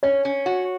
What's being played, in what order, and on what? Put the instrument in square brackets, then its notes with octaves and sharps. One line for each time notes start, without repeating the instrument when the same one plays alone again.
[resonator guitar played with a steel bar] C#4 [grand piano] C#5
[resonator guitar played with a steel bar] C#4
F#4